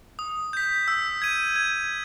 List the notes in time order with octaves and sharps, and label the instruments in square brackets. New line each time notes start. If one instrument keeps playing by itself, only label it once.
[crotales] D#6
G6 B6
E6
G#6 D#7
G#6